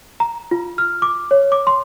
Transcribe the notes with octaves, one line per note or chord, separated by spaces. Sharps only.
A#5
F4
F6
D6
C#5
D6
C6